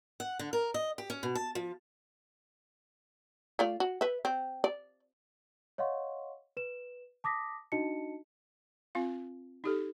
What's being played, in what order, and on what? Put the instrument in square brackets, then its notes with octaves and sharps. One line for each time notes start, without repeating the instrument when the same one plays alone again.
[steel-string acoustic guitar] F#5
D3
A#4
D#5
G4
C#4
B2
A5
F3
[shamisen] A3 F4 D5
F#4
B4 E5
C4
D5
[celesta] C#5 D#5 F5 F#5 C6 C#6
B4 E7
A5 D6 D#6 A#6 B6
D4 D#4 F#4 D#5 A5 C#7
[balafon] C4 F4 F5
D#4 G4 A4